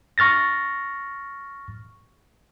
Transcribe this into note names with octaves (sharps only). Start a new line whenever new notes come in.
C#6 F6 A6 A#6